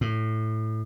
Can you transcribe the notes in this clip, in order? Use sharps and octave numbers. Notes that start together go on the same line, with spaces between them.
A2